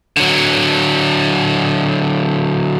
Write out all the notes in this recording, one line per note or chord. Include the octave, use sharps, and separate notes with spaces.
D3 F#3